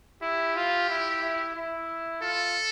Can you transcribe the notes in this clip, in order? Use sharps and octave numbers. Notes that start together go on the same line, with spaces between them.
E4 G4
F4
E4
E4
E4
F4 A4